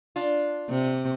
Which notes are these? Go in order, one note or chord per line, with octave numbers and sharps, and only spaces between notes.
D4 F4
C3